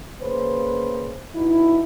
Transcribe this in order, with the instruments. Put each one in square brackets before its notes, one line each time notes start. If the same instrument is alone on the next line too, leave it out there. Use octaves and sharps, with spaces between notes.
[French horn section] C#3 A#3 B4 C5
B2 D#4 E4